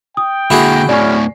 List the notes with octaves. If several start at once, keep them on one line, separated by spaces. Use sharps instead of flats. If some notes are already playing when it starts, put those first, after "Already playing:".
G5 D#6
D3 A#3 E4 F#4 G#4
D2 A2 C#4 D5 G#5 C#6